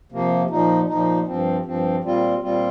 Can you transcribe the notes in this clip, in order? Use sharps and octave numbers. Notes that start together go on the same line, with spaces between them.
C3 F3 A#3
A#2 F3 D#4
A#2 F3 D#4
G2 F3 C4
G2 F3 C4
A#2 G3 C4 F4
A#2 G3 C4 F4